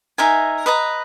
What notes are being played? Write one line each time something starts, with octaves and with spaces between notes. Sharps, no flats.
D#4 A#4 E5 G#5
B4 D#5 A#5